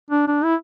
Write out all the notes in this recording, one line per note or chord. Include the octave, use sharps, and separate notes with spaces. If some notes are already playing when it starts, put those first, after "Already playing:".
D4
D4
E4